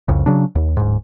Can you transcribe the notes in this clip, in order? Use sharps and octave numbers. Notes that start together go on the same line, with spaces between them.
C2 F2 C#3
C#3 F#3 D4
D#2
D1 G#2